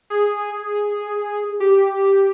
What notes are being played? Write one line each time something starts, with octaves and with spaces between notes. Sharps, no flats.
G#4
G4